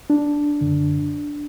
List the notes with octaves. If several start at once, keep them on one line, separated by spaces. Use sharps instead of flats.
D4
F#2 D3